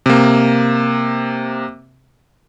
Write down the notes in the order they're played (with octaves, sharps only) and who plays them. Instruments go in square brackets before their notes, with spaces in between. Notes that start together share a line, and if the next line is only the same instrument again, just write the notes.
[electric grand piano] C3 A#3